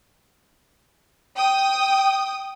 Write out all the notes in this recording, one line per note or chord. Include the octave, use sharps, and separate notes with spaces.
G5 D#6